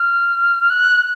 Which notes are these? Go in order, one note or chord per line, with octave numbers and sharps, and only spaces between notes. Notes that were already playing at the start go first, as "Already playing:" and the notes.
Already playing: F6
F#6